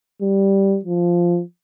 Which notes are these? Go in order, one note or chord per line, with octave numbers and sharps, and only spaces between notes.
G3
F3